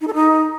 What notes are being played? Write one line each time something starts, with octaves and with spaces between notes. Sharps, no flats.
D#4
A4
D#4